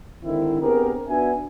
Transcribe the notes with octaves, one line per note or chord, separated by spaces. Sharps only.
G#2 D3 D#3 C4 E4
B3 C4 D4 G4 G#4 A#4
B3 D4 F#4 E5 G#5